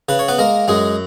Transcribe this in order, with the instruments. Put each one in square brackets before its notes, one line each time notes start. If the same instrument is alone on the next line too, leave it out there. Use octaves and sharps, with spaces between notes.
[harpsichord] C#3 B4
C#5
B3 B4
G#3 A#3 A#4
F#2 G#3 G#4